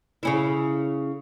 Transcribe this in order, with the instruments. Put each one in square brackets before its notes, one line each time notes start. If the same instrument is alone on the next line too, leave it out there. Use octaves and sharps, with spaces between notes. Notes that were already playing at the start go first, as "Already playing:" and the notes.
[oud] C#3 C#4 E4